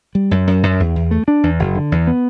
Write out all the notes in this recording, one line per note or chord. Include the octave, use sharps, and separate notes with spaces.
G3
F#2
F#2
F#2
E2
E2
A3
D4
E2
F#1
D3
E2
B3